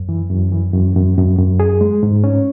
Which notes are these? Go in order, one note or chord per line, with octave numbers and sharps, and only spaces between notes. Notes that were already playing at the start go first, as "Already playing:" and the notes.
Already playing: F#2
E3
F#2
E3
F#2
F#2
F#2
F#2
G#4
G#3
G#2
C#4